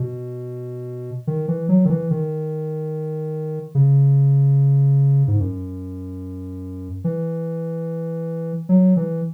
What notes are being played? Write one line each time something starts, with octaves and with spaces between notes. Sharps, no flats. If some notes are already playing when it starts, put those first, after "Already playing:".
Already playing: B2
D#3
E3
F#3
D#3
E3
D#3
C#3
G#2
F#2
E3
F#3
E3